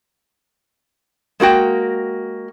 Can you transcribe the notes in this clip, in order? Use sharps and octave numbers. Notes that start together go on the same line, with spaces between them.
G#3 A#3 F#4 G5